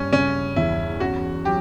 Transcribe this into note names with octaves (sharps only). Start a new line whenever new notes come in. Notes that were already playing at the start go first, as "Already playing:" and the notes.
Already playing: G2 C#4
C#3 C#4
E2 E4
C#4 F#4
F#3 G4